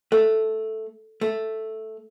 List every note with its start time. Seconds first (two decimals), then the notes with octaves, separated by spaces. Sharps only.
0.12 A3 A4
1.21 A3